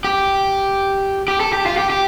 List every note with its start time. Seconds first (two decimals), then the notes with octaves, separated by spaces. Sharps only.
0.04 G4
1.28 G4
1.40 A4
1.53 G4
1.66 F4
1.77 G4
1.90 G4